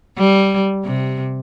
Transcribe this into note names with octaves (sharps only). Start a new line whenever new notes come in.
G3
C3